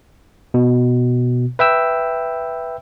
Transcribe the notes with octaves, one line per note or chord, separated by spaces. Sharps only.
B2
B4 E5 G5 E6